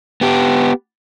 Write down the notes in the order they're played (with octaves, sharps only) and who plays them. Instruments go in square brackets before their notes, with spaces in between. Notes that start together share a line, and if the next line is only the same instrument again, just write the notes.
[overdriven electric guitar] B3 G4